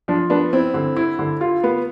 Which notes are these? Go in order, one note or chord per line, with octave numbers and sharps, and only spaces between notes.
F3 D4
B3 D4
C4 E4
D3
E4
D3
F4
B3